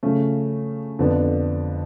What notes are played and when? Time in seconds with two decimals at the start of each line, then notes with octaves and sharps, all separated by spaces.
0.03 C#3 F3 A3 C#4
0.99 F2 D3 F3 B3 D4